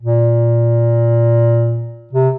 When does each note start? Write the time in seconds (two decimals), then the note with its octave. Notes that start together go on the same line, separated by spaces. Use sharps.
0.01 A#2
2.13 C3